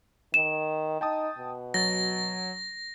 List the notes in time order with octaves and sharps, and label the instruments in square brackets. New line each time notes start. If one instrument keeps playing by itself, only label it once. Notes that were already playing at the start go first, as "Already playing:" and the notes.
[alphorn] D#3 [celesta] E7
[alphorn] D#4 [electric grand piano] G5 A5 D#6
[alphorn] B2
[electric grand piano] F#3 A6 [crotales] A#6